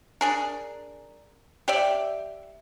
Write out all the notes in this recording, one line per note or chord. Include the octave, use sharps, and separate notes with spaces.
D4 G#4 A#4
G4 D5 E5